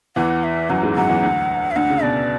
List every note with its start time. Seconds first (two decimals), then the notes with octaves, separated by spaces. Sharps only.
0.16 E2 E3 F#5
0.44 E5
0.69 F#2 F#3 F#5
0.83 G#2 G#3
0.95 F#2 F#3 F#5
1.09 E2 E3
1.23 D2 D3
1.71 E5
1.76 D2 D3 F#5
1.90 C#3
2.03 B2 D5